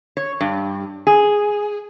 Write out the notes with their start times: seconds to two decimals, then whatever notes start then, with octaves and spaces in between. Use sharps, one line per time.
0.17 C#5
0.41 G2
1.07 G#4